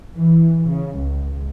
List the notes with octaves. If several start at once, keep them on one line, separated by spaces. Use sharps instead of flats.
E3
C#3
C#2